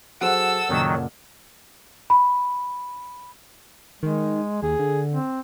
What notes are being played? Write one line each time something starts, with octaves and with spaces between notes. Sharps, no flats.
F#3 G#4 A4 C5 F#5 E6
F#1 A#2 D#3 F#3
B5
D#3 G#3
D#2 G#4
D3
C4